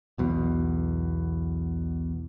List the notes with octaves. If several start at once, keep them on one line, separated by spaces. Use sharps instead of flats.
B1 E2 B2